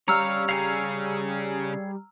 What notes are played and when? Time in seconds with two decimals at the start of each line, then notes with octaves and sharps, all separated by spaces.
0.08 G3 C#4 C#5 F5 A#5 E6 F6
0.49 C#3 C#4 G#4 C#5 F5